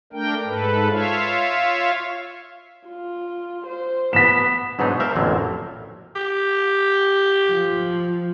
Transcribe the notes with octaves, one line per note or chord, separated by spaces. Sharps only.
A3 D4 A#4 G5
G#2 A4 B4
F4 C#5 E5 F5
F4
C5
B3 B6 E7
G#2 B2 F#3 D4 D#4
A#4 C5 E5 F5
A1 F2 A#2 D3 F#3
G4
F3